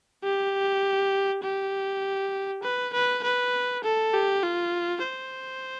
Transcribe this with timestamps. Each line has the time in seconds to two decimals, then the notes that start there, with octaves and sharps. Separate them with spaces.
0.23 G4
1.43 G4
2.63 B4
2.93 B4
3.23 B4
3.83 A4
4.13 G4
4.43 F4
5.03 C5